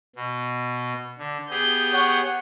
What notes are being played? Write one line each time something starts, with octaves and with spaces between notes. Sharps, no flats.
B2
D3
B3 G4 G#4 G6
C#5 F#5